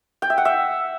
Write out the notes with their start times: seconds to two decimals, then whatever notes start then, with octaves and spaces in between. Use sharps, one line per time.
0.22 G5
0.30 E5
0.38 F#5
0.45 E5